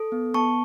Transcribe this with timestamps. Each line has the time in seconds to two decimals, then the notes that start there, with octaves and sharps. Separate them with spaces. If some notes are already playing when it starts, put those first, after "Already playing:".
Already playing: A4
0.12 B3
0.34 B3 A5 C#6